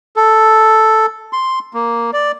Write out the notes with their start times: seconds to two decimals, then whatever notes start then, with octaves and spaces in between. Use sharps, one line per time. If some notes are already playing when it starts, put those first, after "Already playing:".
0.16 A4
1.33 C6
1.74 A#3
2.13 D5